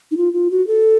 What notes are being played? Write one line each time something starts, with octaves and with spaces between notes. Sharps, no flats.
D#4
F4
F4
F#4
A4